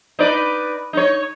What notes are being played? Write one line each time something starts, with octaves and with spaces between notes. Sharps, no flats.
D#4 B4 D5
D#4 C#5